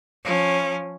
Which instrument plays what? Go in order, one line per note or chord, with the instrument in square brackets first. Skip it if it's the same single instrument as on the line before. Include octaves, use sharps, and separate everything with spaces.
[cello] F3 C#4